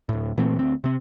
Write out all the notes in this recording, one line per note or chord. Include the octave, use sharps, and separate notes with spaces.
D1 A2
A#2 E3 A3 C4
D2 C4
C3 C4